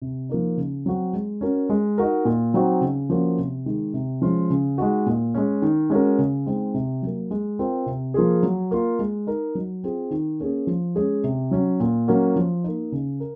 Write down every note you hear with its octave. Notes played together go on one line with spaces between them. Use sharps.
C3
F3 A#3 D#4
C#3
F#3 C4 F#4
G#3
C#4 F#4 A#4
G#3
D#4 F#4 A#4
A#2
F#3 C4 D#4 F#4
C#3
F3 A#3 C#4 F#4
C3
D#3 G#3
C3
F3 G#3 C#4 F4
C#3
G#3 D#4 F#4
A#2
G#3 C#4
D#3
G#3 C#4 F#4 A#4
C#3
G#3 C4 D#4
C3
F#3 A#3
G#3
C4 F4 A#4
C3
F3 A#3 F4 G#4
F#3
A#3 F4
G#3
D#4 A#4
F#3
C4 F4 G#4
D#3
A#3 C#4 G#4
F3
G#3 C#4 G#4
C3
F#3 C#4
A#2
F#3 A#3 C#4 F#4
F3
A#3 D#4
C#3
A#4